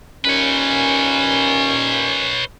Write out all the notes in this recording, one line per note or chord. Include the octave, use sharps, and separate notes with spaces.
D#2 A#2 C#4 B4 C#5